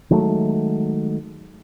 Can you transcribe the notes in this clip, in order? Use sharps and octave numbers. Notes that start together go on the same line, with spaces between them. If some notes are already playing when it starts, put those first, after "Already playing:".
D#3 F#3 G#3 A3